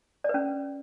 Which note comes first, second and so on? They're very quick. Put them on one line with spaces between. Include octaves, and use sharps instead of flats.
D5 B4 C#4